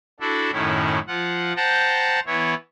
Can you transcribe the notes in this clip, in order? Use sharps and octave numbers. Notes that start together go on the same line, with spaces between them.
D4 E4 F#4 A4
F#2 A2 D#3 C#4 E4
F3 F4 F#5
C5 F#5 G5 A5 A#5
E3 B3 E4 C#5